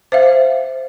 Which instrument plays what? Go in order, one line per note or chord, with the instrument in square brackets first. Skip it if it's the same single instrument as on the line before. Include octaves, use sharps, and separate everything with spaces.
[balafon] C5 E5 F5